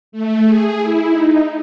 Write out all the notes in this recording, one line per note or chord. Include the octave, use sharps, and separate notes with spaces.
A3
G#4
E4
D#4